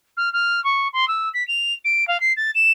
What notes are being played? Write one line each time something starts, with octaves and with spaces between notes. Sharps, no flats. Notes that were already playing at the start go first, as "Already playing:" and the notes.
F6
F6
C#6
C6
E6
B6
F7
D7
F5
C7
A6
E7